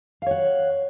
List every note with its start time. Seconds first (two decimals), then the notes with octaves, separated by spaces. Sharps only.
0.22 F5
0.26 C#5
0.31 F#5